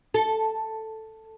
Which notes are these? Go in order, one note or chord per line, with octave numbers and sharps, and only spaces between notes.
A4